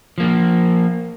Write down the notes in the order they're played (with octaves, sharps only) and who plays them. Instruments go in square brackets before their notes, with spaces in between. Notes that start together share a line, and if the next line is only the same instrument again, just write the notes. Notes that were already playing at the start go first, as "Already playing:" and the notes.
[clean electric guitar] F3 A#3